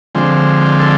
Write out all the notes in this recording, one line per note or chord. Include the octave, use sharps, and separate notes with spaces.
D3 F3 G#3 C4
A4